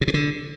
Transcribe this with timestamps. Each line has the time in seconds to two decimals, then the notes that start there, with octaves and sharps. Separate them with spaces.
0.01 C3
0.08 B2
0.14 D3